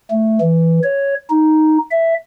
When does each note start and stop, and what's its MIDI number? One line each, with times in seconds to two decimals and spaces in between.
0.11 0.39 57
0.41 0.79 52
0.83 1.15 73
1.30 1.78 63
1.91 2.14 76